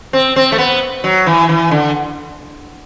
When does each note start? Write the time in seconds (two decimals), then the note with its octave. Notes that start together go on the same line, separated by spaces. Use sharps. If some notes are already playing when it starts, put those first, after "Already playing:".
0.13 C4
0.36 C4
0.52 A3
0.58 B3
1.04 F#3
1.26 E3
1.49 E3
1.71 D3